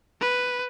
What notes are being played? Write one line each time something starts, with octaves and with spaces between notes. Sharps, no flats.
B4